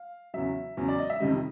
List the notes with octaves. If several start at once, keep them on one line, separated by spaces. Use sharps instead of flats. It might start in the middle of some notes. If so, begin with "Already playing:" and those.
Already playing: F5
E2 C#3 F#3 E5
E2 C#3 F#3
D5
D#5
E5
F2 C3 D#3 G3 D#5